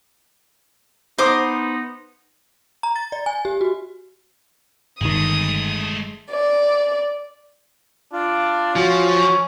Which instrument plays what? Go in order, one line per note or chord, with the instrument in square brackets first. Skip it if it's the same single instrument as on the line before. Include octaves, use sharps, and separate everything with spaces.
[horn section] B3 D#4 [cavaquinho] C5 D6 D#6
[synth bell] A#5
A6
D5
G#5
G4
F#4
[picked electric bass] G1 D#3 [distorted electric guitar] G#3 A3 [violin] D#6
[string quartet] D5
[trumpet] D4 [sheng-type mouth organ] F4
[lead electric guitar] F3 [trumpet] C#4 [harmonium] F#4